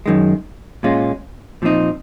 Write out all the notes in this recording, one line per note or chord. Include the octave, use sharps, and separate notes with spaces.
F#2 D#3 G#3
A#2 G#3 C#4 F4
A#2 F3 C4 D#4